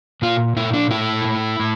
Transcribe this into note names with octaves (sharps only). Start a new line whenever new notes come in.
A#2 F4
A#2 E4
D4
A2 E4
A2
A2